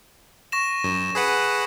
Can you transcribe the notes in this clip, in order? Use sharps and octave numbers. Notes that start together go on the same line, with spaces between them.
C#6 A#6 E7
F#2
G#4 B4 F#5